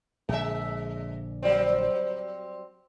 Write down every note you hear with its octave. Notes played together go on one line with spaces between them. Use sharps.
A#1 D3 G#3 E5
F#3 G3 C4